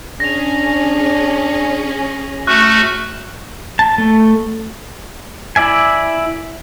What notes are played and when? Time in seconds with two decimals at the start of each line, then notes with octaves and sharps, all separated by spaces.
0.20 C#4 D4 G#4 A#6 F7
2.47 A3 F#4 C#6 F6 F#6
3.79 A5
3.98 A3
5.56 E4 D5 E5 G#5